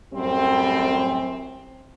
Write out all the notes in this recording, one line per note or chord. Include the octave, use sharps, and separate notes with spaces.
F#2 A2 G3 C4